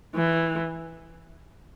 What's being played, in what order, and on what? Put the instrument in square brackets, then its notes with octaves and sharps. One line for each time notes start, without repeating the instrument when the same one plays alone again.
[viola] E3